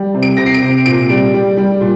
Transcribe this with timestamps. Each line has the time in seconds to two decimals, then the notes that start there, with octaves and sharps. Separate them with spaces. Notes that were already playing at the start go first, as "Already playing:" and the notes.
Already playing: G3
0.14 C3
0.22 D7
0.37 C3 A#6
0.46 C7
0.54 D7
0.62 C3
0.86 A#2 D7
1.10 G3
1.34 G3
1.57 G3
1.81 A#2